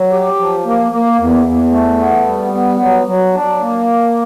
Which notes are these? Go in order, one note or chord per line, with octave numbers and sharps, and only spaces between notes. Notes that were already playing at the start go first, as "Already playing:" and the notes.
Already playing: F#3
G4
F3
A#3
A#3
E2
E2
A3
B3
G3
B3
F#3
F#3
D4
A#3